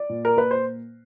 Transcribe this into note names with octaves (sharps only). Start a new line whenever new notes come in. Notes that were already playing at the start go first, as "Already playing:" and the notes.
Already playing: D5
A#2
A#4
A#2 B4
C5